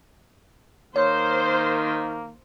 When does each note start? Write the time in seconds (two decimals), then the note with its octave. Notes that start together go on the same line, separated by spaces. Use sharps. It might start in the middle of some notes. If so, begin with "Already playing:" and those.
0.96 D#3 A#3 C5 C#5